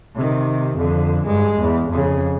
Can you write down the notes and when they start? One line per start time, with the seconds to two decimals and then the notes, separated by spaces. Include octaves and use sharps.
0.16 C3 D#3
0.78 F2 D3
1.25 G2 G#3
1.60 E2
1.89 F2 C#3